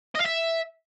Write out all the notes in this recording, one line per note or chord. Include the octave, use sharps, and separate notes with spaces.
D#5
F5
E5